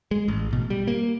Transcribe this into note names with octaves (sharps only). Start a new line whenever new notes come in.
G#3
A1
B2
G3
A#3